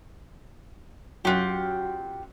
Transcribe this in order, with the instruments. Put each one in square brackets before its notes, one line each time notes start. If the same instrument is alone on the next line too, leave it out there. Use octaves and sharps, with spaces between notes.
[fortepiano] F#2 F#5 [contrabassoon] F#3 [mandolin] F4 G4